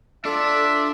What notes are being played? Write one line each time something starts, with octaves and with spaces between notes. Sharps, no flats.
D4 F4 A4 E5 D6